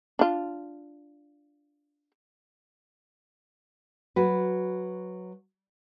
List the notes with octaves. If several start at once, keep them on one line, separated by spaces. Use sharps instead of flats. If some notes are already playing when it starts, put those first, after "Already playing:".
D4 F4
F#3 F#4 B4